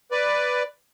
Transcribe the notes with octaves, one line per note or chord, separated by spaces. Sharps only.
B4 D5